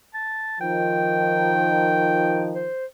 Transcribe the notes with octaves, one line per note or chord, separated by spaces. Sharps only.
A5
D#3 F3 G5
C5